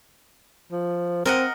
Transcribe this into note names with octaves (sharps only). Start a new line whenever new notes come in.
F3
C4 A#4 D#5 F#5